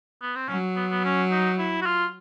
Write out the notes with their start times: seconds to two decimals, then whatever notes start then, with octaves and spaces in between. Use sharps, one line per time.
0.22 B3
0.36 C4
0.49 F#3 C#4
0.76 B3
0.91 B3
1.04 C#4
1.31 D#4
1.58 E4
1.82 F#4
1.86 F4